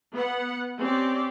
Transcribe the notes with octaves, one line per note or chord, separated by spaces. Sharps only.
B3 F#5
C4 C#4 G4 D5